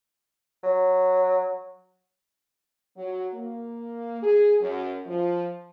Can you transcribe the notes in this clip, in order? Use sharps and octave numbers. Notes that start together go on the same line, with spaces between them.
F#3
F#3
A#3
G#4
F#2
F3